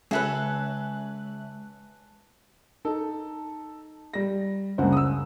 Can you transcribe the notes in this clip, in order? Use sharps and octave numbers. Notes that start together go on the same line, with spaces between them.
C#3 G#3 G#4 A4 B4 E5 F#6
D#4 A4
G3 A#6
F#1 C#2 G2 A#3 C5 F#5
D#6 E6